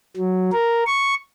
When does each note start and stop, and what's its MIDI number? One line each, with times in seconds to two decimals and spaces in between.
0.16 0.50 54
0.52 0.84 70
0.87 1.15 85